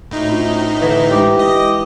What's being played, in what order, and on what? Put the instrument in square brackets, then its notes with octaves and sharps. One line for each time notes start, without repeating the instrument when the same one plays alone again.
[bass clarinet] D2 [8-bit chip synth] A2 D#4
[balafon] C#4 D4 F4
[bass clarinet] D3 [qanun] E3 E5
[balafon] G#3 D4 C5 [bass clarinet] G4
[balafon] E4 [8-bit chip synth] D#5